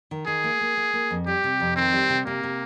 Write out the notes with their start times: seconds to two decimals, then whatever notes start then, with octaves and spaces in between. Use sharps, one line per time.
0.11 D#3
0.27 D#3 G#4
0.44 A#3
0.61 A#3
0.77 A#3
0.93 A#3
1.11 F2
1.27 G3 G4
1.44 C3
1.60 F2
1.76 D#3 C4
1.93 G3
2.09 C3
2.26 C3 A#3
2.43 C3